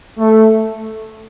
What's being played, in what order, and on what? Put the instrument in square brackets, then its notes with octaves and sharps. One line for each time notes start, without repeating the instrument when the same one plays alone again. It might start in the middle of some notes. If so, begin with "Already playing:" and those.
[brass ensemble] A3